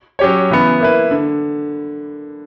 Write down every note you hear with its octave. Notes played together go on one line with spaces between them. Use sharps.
F#3 C#4 G4 C#5
C#3 E3 B3
A#3 E4 B4
D3